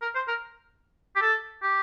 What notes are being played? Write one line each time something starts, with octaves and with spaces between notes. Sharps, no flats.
A#4
C5
A#4
G4
A4
G4